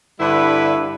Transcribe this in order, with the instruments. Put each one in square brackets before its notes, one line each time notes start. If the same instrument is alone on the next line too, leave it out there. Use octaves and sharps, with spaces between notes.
[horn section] G2 D3 G3 E4 B4